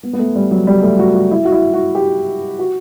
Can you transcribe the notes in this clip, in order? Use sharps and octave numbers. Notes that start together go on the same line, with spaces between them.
B3
B3
A3
G3
F#3
G3
A3
F#4
F#4
E4
F#4
E4
F#4
G4
F#4